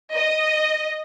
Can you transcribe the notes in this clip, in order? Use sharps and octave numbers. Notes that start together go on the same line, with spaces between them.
D#5